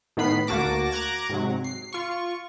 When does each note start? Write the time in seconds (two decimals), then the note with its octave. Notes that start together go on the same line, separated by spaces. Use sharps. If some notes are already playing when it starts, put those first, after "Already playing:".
0.17 A2 D#3 B3 B5 C7
0.47 D2 A#3 F#4 A5 D6 A#6
0.91 A#5 D6 F#6 G#6 A#6
1.29 G#2 C3 F#3
1.64 C7
1.93 F4 C#6